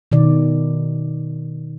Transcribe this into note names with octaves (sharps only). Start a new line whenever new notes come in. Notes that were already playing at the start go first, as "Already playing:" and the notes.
B2 D#3 D5